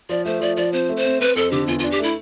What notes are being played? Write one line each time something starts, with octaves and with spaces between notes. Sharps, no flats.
F3 D5
A3 C5
F3 D5
F3 D5
C4 C5
A3
C5
C4
C4 B4
F2 A4
D3 G4
E2 F4
D4 F4
G4
A3 E4